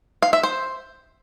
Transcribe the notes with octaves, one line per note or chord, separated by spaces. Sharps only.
F5
E5
C5